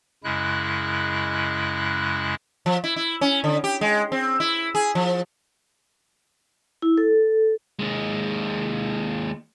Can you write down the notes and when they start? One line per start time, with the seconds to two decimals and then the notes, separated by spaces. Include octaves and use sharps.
0.24 F#2 C#3 G#3 E4 F#6
2.66 F3
2.84 E4
2.96 E4
3.21 C#4
3.44 D3
3.64 G4
3.81 G#3
4.12 C4
4.40 E4
4.75 G#4
4.95 F3
6.82 E4
6.98 A4
7.79 D#2 G#3